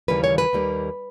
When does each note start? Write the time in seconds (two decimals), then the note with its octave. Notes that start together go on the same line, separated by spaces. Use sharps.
0.08 D#2 C#3 E3 G3 A#3 B4
0.24 C#5
0.38 B4
0.53 D#2 D#3 G3 A#3